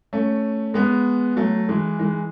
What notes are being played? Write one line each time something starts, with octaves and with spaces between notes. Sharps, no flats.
A3 C#4
G#3 B3
F#3 A3
E3 G#3
E3 G#3